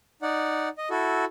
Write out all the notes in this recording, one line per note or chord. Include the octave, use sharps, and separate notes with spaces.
D#4 D5 F#5
D#5
E4 F#4 A4